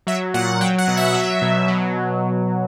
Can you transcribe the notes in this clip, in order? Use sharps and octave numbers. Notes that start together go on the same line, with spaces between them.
F#3 E5
A#2 F#5
F#3 G5
F#5
B2
E5
F#3
B2
F#3